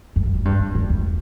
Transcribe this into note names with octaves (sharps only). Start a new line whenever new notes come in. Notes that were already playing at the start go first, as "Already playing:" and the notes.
F#2
F#2
A#2
G2
G2
F#2
E2